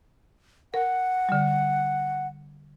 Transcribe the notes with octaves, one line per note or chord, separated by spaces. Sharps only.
A#4 F#5
D3 G3